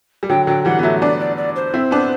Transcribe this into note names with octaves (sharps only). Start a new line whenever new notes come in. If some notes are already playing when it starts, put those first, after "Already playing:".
G3
D3 F#3 G5
D3 F#3 G5
E3 G3 F#5
B3
F#3 A3 E5
B3 D4 D5
D5
D5
C5
C4 E4
B3 D4